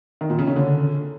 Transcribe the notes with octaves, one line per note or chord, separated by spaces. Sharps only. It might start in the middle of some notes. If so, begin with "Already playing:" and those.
D#3
A#2
C#3
C#4
D3